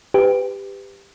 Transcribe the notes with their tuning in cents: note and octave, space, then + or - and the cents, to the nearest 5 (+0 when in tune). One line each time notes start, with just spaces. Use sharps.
G4 +15 B4 +25